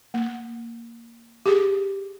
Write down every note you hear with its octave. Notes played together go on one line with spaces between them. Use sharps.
A#3
G4 G#4